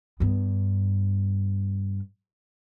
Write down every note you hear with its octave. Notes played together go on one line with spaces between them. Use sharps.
G2 B3